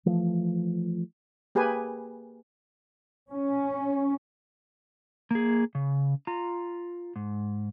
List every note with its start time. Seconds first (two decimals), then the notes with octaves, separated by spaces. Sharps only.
0.06 E3 F3 A3
1.55 A#3 G4 G#4 B4 G#5
3.31 C#4
5.31 A#3 G#4
5.75 C#3
6.27 F4 A#5
7.16 G#2